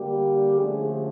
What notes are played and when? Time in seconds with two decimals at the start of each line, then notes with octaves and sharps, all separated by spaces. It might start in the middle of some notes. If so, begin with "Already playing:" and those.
Already playing: D3 G3 A#3 G4
0.57 D3 F3 A3 C#4 G#4